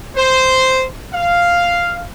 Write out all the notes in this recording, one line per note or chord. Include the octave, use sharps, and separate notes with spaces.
C5
F5